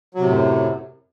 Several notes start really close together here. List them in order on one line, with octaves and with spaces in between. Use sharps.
F#3 C3 A2 F#2